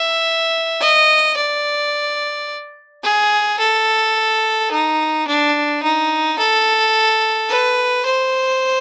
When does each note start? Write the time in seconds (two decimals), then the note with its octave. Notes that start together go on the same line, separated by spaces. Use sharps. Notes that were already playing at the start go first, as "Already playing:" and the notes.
Already playing: E5
0.81 D#5
1.36 D5
3.03 G#4
3.59 A4
4.71 D#4
5.27 D4
5.83 D#4
6.39 A4
7.49 B4
8.05 C5